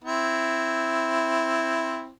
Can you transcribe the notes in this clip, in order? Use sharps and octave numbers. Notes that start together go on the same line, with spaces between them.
C4 E4